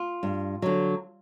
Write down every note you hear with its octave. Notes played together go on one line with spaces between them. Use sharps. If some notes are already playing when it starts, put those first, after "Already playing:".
Already playing: F4
G2
D3 F#3